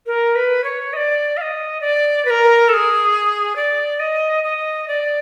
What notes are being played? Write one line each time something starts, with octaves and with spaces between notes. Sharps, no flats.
A#4
B4
C#5
D#5
D5
F5
D#5
D5
B4
A#4
A4
G#4
D5
D#5
D#5
D5